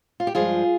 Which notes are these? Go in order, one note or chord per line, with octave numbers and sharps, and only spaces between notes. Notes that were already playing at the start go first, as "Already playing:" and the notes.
F4
G4
G2 F3 G#3 F4 G#4